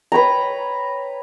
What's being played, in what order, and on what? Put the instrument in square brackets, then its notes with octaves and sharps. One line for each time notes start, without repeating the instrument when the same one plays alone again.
[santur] B4 C#5 G5 A#5